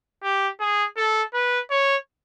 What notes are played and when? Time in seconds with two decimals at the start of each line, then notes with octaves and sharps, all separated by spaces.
0.23 G4
0.60 G#4
0.97 A4
1.34 B4
1.70 C#5